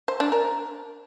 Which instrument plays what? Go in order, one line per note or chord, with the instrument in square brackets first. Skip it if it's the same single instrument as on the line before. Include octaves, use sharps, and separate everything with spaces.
[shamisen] C5
D4
A#4